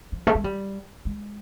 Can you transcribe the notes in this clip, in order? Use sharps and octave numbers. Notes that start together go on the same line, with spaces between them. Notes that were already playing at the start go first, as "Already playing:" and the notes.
F3
A3
G#3
G3
G#3